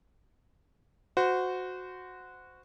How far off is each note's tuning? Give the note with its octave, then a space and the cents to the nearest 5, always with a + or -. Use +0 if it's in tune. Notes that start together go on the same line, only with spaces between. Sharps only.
F#4 -10 C5 -25